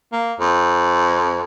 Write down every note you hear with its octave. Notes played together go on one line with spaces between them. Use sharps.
A#3
F2